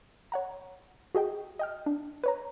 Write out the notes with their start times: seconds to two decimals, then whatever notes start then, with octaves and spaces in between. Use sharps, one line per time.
0.32 C#5 F#5 A#5
1.15 F#4 G#4 D#5 G5
1.59 D#5 G5 F6
1.86 D4
2.24 B4 C#5 A#5